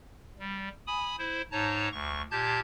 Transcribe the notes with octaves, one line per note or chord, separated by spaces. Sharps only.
G3
G#5 B5 D#6
E4 C5
G#2 D#4 C#5 A5 A#5
D2 C#6
A#2 G4 A5 G6 G#6